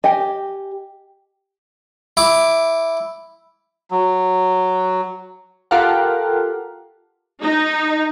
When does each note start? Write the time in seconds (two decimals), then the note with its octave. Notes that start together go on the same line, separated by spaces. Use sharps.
0.04 G4 D#5 G#5
2.17 E4 D6
3.91 F#3
5.71 F4 G4 A4 A#4 F5 F#5
7.42 D#4